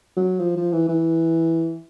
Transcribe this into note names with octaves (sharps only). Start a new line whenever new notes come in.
F#3
F3
F3
E3
E3